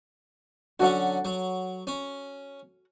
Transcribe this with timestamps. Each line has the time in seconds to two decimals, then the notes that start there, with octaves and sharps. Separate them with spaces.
0.80 D3 F#3 C#4 F#4 A4 F#5
1.25 F#3
1.87 C#4